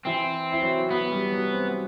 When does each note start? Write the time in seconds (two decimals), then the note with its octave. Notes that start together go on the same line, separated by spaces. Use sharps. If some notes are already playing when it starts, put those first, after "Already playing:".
0.06 E3 C4 E4
0.52 E4
0.62 F#3 F#4
0.90 F#3 B3 F#4
1.12 G3 G4
1.32 F#3 F#4
1.53 C4